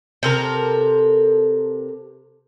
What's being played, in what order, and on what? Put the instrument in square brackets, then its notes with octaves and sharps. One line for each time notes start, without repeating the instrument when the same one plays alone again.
[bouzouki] C3 A4 A#4